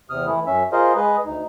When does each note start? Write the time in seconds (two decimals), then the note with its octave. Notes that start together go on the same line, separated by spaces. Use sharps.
0.10 E2 C3 D#6 F6
0.26 E3 A3 E4
0.47 F#2 C#4 E5
0.72 F4 G#4 A#4 C5 D#5 F5
0.96 G#3 G#4 B4 D#5
1.25 D2 D#4